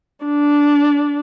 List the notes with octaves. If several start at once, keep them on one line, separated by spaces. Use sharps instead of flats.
D4